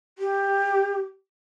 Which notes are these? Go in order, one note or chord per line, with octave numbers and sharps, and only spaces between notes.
G4